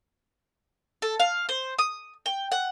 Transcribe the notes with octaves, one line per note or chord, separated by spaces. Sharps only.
A4
F5
C5
D#6
G5
F#5